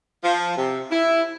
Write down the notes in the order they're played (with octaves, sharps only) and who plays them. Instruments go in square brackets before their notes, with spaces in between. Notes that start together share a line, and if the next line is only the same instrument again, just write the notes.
[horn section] F3
C3
E4